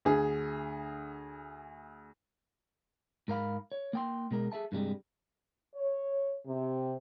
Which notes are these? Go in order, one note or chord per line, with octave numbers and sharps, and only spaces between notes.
D2 G#4
G#2 A#4 F5 B5
C#5
A#3 G5 C6
B2 G#3 A#4
G#4 A4 E5 A5
G2 C3 G3 G#3
C#5
C3